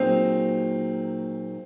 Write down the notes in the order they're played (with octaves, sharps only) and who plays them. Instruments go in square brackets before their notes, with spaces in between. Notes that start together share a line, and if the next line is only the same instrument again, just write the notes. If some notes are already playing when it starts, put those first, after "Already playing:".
Already playing: [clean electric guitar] A#2 F#3 A#3 D#4 G#4 [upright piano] C4